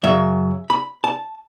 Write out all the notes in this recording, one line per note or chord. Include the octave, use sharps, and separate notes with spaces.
F#2 C#3 F#3 E5
B5
A5